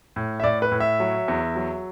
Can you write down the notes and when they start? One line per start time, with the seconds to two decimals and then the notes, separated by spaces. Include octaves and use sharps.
0.16 A2
0.40 E5
0.43 A2 D5
0.62 B4
0.72 A2
0.80 E5
1.00 F#3
1.28 E2
1.56 F#3